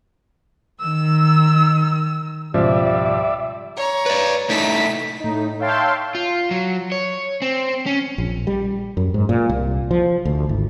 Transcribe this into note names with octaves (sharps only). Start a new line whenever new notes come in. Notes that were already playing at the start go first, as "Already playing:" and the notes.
D#3 E6
C#2 G#2 B2 F3 G3 D5 E5
C#5 A#5
B4 D5
A3 D#4 E4 B6
A2 D#4
C#5 E5 F5 G5 A5 C6
F4
F#3
C#5
C4
C#4
A#1
G3
F#2
G#2
A#2
C2
F3
D2
G#1